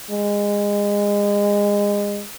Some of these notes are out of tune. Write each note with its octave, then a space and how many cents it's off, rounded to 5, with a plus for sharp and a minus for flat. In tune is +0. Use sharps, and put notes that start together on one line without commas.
G#3 -25